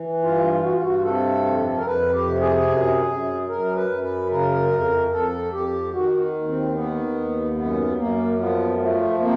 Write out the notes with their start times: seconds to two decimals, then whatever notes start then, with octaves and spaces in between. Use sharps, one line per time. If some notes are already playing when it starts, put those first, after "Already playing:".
Already playing: E3
0.23 G2 F4
0.64 G2 F#4
0.73 F4
0.83 F#4
1.04 C3 A4
1.45 F2
1.70 A4
1.77 A#4
1.86 F2 B4
2.13 G4
2.26 C3
2.41 G#4
2.68 F#2
3.08 F#2
3.49 F#2 A#4
3.76 B4
3.90 F#2
4.03 B4
4.30 C#3 A#4
4.71 F2
5.12 F2 A4
5.53 F2 G4
5.94 D#3 F#4
6.35 D#2
6.48 C4
6.74 D#3 B3
7.15 D#2
7.56 F#2 B3
7.97 F#2 A#3
8.39 F3 B3
8.78 F3 A3
9.20 C3 A#3